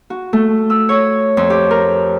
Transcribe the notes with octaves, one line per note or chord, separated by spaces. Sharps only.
F#4
A3
E6
C#5
F2
G4
A#4